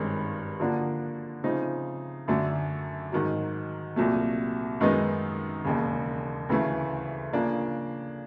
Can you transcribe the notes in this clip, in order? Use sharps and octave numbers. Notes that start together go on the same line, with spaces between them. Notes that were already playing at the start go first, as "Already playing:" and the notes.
Already playing: G#1 G2 D#3 G#3 C#4
D3 F3 A#3 D4 F#4
C#3 F3 A3 C4 D#4
F#2 D3 F#3 A3
G#2 D#3 F#3
C2 A#2 F#3 A3
F#2 D#3 G#3 B3 D#4
E1 D#2 C#3
D2 C#3 E3 A3
C#3 F3 A#3 D4